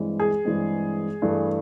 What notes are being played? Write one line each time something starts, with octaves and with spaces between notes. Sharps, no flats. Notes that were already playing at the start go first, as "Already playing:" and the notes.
Already playing: G2 E3 G#3 C4
G#4
G2 E3 G#3 C4
G2 E3 A3